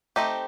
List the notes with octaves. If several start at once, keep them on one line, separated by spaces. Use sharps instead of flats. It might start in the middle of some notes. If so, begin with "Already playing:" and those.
A3 C4 D#4 G4